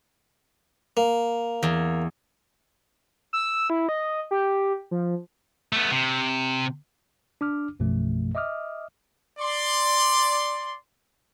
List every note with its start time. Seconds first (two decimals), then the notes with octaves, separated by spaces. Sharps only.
0.97 A#3
1.63 E2
3.33 E6
3.70 E4
3.89 D#5
4.31 G4
4.91 F3
5.73 A3 B3
5.92 C3
7.41 D4 D6 F6
7.79 A#1 F#2 B2 F3 A3
8.35 D#5 E5 D6 D#6 F6
9.39 D5 C6